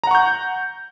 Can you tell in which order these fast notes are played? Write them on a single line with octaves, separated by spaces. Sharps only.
A#5 F#5 C#6 G6